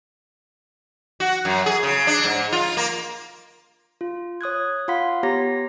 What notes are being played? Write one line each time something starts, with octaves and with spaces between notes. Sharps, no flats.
F#4
F#2
G#4
C#3
D4
G#2
F4
A#3
F4
C#5 D#6 F#6 G#6
F4 F5 F#5 B5 C6 B6
B3 G4 C#5 A#5 A#6